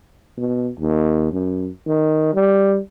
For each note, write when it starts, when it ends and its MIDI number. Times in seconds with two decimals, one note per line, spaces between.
0.38 0.69 47
0.80 1.30 39
1.33 1.70 42
1.87 2.33 51
2.34 2.78 55